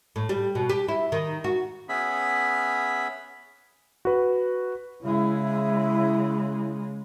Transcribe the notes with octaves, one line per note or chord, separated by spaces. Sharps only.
A2
G3
B2
G4
E4
D#3
F#4
B3 C#4 G#4 E5 B5
F#4 B4
C#3 G#3 E4